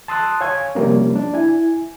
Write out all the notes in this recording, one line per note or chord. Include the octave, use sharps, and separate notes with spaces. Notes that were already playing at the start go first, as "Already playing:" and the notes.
A5 C6 D#6 E6 F#6
C#5 F5 G#5 C#6 G#6
C3 F3 G3 A#3 C#4
D4
E4 G#5